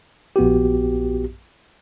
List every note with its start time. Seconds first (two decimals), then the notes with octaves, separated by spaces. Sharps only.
0.36 A#1 B3 F#4 G4